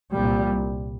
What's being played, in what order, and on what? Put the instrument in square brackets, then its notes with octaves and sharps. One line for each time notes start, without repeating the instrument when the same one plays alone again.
[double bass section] C2 A#2 G3